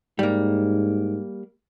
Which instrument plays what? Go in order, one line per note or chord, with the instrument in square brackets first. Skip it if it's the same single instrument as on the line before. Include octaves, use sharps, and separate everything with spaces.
[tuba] G#2 [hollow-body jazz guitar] G3 A#3